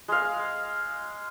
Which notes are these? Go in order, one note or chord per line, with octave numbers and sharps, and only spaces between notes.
G#3 F5